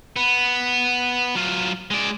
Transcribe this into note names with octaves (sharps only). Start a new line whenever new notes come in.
B3
F#3 F4
G#3 D5